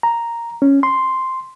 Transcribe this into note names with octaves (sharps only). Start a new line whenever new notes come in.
A#5
C#4
C6